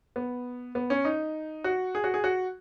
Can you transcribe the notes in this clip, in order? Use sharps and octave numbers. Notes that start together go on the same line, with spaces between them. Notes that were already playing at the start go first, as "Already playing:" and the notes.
B3
B3
C#4
D#4
F#4
G#4
F#4
G#4
F#4